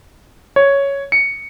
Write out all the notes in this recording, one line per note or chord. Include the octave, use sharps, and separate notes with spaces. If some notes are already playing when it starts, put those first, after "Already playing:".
C#5
C#7